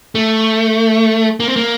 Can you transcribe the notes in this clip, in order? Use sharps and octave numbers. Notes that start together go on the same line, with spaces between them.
A3
A#3
C4
A#3